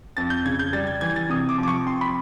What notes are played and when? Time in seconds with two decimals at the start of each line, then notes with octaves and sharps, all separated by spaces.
0.17 F2 A6
0.30 G6
0.45 C#3 G#6
0.59 G6
0.73 G3 A6
0.87 G#6
1.01 E3 G#6
1.16 A6
1.29 C3 D#6
1.49 D6
1.58 F3
1.63 D6
1.68 C#6
1.86 C4 C6
2.01 B5